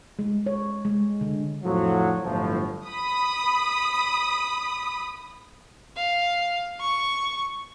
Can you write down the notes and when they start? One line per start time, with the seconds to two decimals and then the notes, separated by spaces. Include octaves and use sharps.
0.19 G#3
0.46 C#5
0.85 G#3
1.21 D3
1.64 F2 A2 D3 F3 F#3
2.23 G1 A2 F3 F#3
2.87 B5 D#6
5.96 F5
6.80 C#6